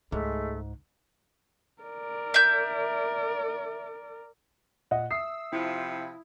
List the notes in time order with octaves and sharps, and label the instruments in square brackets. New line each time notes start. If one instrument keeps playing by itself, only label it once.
[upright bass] C#2 [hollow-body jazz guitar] G#2 [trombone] G#3 [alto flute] A3
[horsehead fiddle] A#4 D5
[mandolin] E5 G6
[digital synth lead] A#2 [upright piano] D#5 F#5
[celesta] E5 D#6 [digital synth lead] E6 [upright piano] C7
[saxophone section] C3 F3 [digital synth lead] E4